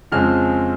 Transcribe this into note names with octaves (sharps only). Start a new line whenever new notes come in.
F2 C#3 F3 G#3 C4 F6